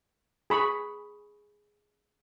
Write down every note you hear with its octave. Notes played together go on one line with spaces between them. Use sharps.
G#4 B5 C#6